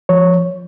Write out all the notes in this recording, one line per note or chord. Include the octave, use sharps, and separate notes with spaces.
F3 C#5